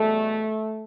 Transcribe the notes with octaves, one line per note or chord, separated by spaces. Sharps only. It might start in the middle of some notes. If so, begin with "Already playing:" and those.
Already playing: E2 B2 G3 A3